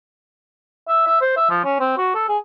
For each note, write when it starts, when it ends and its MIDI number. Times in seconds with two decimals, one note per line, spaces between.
0.88 1.06 76
1.06 1.19 76
1.21 1.34 72
1.37 1.47 76
1.50 1.61 53
1.64 1.77 61
1.80 1.97 60
1.98 2.12 66
2.15 2.26 69
2.28 2.38 68